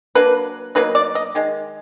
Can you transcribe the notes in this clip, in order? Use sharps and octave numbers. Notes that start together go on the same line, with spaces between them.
F#3 A#3 D4 B4
B2 F#3 A#3 D#4 B4
D5
D#5
D#3 G#3